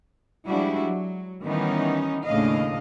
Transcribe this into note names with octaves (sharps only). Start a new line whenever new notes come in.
F3 G3 G#3 D4 E4 F#4
F#3
D#3 E3 G3 B3 C#4 D#4
D#2 A2 C#3 D4 D#5 F5